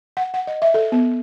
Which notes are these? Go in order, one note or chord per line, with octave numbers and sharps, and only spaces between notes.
F#5
F#5
D#5
E5
A4
B3